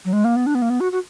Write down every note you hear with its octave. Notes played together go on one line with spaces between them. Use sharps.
F#3
G#3
A#3
B3
D4
B3
A#3
B3
F#4
F#4